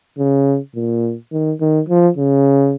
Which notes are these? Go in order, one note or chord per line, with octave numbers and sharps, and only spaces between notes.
C#3
A#2
D#3
D#3
F3
C#3